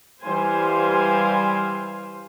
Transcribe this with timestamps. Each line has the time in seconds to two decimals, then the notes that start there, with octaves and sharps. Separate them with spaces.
0.23 E3 G3 C5 F5 G#5